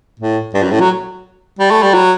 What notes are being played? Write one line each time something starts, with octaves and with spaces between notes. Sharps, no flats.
A2
G2
F#2
A2
F#3
G3
A3
G3
F#3